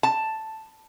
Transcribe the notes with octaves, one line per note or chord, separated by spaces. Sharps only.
A5